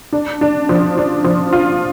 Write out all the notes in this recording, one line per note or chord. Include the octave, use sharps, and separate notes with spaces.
D4
D4
F3
D4
F3
F4